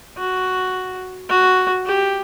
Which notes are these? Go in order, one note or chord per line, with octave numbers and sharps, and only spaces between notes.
F#4
F#4
G4